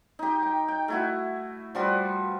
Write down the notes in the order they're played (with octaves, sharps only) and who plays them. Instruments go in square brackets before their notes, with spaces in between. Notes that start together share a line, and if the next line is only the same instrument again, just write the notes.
[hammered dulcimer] D#4 G4
G5
G5
A3 E4 F#4
F3 G3 F#4 B4